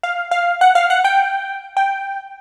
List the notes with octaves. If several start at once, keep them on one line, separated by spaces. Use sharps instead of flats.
F5
F5
F#5
F5
F#5
G5
G5